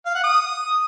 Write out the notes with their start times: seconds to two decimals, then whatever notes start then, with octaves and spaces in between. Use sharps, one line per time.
0.06 F5
0.15 F#5
0.24 D#6